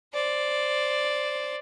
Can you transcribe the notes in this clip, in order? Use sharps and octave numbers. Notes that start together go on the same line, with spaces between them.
C5 D5